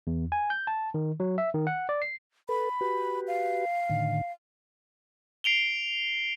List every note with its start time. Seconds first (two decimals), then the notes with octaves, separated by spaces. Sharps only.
0.07 E2
0.32 G#5
0.50 G6
0.67 A5
0.94 D#3
1.20 F#3
1.38 E5
1.54 D#3
1.67 F#5
1.89 D5
2.02 C7
2.49 A4 B4 B5
2.81 F#4 G4 B4
3.28 F5
3.90 A2 D3 D#3
5.44 C7 D7 F7 G7